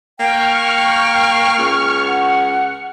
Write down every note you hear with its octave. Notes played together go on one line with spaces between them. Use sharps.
A#3 G5 C#6 F6
G5
C#2
F#5